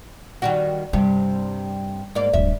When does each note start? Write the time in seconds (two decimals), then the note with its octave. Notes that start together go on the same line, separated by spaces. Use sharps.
0.42 D#3 G3 F#4
0.93 G2 C3 G3
2.15 G#2 A#3 D5
2.33 D1 G2 E5